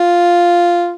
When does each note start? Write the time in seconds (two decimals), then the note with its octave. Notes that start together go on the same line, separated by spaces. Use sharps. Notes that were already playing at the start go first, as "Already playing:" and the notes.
Already playing: F4